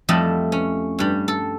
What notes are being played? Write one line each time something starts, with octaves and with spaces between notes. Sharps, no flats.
F2 G3 A3 E4 D#5 A5
C#4
G2 G3
A4